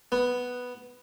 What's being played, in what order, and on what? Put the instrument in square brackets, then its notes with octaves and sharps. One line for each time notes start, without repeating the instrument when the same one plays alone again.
[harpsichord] B3